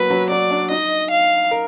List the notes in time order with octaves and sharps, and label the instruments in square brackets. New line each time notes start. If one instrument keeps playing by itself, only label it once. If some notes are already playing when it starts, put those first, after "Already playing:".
Already playing: [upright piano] F#3 A#3 B3 [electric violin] B4
[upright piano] F#3
[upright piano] F#3 [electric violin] D5
[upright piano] D4
[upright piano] D#4 [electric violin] D#5
[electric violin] F5
[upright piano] A#4